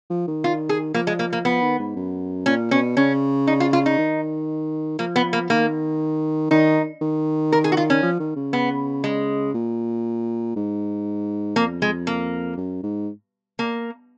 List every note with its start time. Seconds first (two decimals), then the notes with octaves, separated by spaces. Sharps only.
0.10 F3
0.27 D#3
0.44 F4
0.69 G#4
0.94 F3 A#3
1.07 G#3
1.19 A#3
1.33 A#3
1.45 F3 B3
1.62 D#3
1.79 G#2
1.96 F#2
2.46 A#2 C#4
2.71 B2 C#4
2.97 C#3 C#4
3.47 D#4
3.60 F4
3.73 F4
3.86 D#4
3.98 D#3
4.99 F3 A#3
5.16 B3
5.33 A#3
5.49 D#3 A#3
6.50 D#3 D#4
7.01 D#3
7.52 A#4
7.64 G#4
7.72 F#4
7.77 F4
7.90 C#4
8.02 F3
8.19 D#3
8.36 C#3
8.53 B3
9.04 G#3
9.54 A#2
10.56 G#2
11.56 F2 A#3
11.82 G#3
12.07 A#3
12.57 F#2
12.83 G#2
13.59 A#3